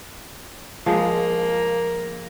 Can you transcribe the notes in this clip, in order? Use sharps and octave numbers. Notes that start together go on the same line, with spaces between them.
F3 G#3 A#3